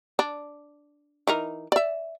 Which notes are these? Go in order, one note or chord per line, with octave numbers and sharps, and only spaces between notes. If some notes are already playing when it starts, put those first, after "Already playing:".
D4
E3 D#4 A#4
D5 E5